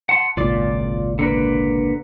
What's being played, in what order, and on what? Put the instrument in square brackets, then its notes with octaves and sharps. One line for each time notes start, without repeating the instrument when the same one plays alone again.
[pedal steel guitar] F#5 A5 C6
[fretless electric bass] G#1 C#2 A#2 [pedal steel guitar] F4 D5 D6
[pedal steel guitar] D3 A#3 B4